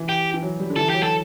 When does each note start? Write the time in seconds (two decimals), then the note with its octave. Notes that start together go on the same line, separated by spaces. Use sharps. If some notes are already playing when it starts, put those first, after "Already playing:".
Already playing: E3
0.09 G4
0.34 E3
0.42 F#3
0.59 G3
0.70 D3
0.76 E3 A4
0.90 F#3 G4
1.03 A4